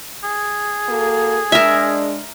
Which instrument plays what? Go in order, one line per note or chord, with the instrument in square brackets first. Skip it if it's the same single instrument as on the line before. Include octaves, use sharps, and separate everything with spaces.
[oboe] G#4
[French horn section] A#3 F#4 A4
[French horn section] G#3 D4 [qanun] A#4 E5